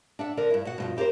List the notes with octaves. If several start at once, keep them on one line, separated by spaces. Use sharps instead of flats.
D4 E5 F#5
D3 A#4 D5
G2 E4
B2 F#4 F#5
G2 B2 F3
E4 G4 G#4 A#4 C5